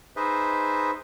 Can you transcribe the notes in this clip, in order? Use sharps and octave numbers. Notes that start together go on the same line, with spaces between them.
D#4 G#4 B4 C5 D#5 E5